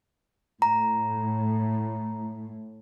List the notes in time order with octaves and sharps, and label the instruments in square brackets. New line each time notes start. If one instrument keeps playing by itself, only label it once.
[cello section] A2 [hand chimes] A#5